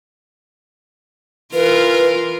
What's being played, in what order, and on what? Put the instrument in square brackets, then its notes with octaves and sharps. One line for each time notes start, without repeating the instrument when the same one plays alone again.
[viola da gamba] E3 F4 A#4 [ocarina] B4